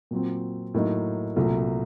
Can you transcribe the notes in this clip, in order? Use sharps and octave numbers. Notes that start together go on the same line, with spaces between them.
A#2 F#3 C4
A2 F#3 A#3 D#4
C2 A#2 F#3 A3